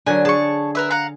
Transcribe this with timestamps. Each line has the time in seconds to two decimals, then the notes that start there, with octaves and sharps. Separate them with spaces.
0.07 D3 F#3 A#4 G#5
0.25 G#4 A5 C#6
0.75 A#4 B4 E5
0.91 F5 F#5 A#5